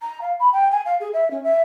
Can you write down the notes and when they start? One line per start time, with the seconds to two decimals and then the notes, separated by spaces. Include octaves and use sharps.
0.01 A#5
0.21 F5
0.39 B5
0.52 G5
0.71 G#5
0.85 F5
1.00 G#4
1.13 E5
1.30 C#4
1.43 E5